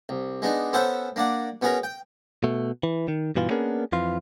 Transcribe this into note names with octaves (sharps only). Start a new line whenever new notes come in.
C2
G#3 B3 D4 D#4
B3 C#4 A4 C5 E5 F#5
A#3 D4 D5 F#5
B2 B3 C#4 G#4 A#4
G5
B2 A3
E3
D#3
G2 B2 E3 F4
A#3 B3 C#4 D4 G#4 A#4
F2 E3 F4